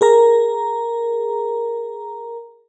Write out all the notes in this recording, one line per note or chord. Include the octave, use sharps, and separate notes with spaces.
G#4 A#4 A#5